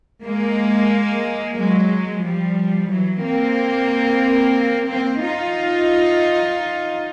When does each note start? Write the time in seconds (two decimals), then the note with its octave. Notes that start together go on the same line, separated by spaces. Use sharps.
0.24 G#3 A#3
1.57 F#3 G#3
2.24 F3 G3
2.91 E3 F#3
3.24 A#3 C4
4.90 A#3 C4
5.24 D#4 F4